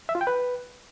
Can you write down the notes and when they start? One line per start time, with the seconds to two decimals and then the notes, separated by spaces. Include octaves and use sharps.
0.09 E5
0.15 F4
0.21 G5
0.27 B4